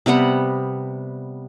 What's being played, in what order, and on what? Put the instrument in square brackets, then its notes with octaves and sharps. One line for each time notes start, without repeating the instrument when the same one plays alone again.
[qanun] C3 G3 B3 F#5